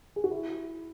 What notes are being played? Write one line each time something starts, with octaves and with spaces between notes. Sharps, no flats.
G#4
F#4
E4